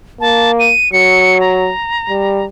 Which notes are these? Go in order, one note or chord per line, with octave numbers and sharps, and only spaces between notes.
A#3 A5
D#7
F#3 C#7
A#5
G3